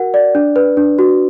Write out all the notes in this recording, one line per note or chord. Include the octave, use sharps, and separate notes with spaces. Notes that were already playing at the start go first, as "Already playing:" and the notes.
Already playing: F#4 A#4 F#5
D5
D4
B4
D4
F#4